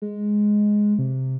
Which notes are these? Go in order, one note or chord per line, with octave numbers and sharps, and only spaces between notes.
G#3
C3